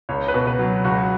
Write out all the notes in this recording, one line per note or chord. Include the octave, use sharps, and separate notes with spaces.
C#2 C#5
B4
B2
B4
F#3
C#2 F#4